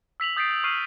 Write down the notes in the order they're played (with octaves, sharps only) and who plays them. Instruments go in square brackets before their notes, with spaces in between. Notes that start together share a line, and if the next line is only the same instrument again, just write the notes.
[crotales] E6 B6 F7 F#7
D#6 G6 A6 B6 C7 D7
C#6 F6 C7 D#7 F#7